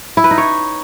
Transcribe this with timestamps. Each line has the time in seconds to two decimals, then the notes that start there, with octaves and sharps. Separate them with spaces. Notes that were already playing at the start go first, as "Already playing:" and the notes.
0.17 E4
0.24 B4
0.31 D#4
0.38 C#5